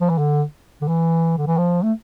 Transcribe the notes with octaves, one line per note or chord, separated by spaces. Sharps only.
F3
E3
D3
D3
E3
D3
E3
F3
A3